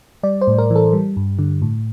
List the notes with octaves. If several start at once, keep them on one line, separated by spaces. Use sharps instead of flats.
G3 D5
C5
A2
A#4
E3
A4
G3
G2
D3
A2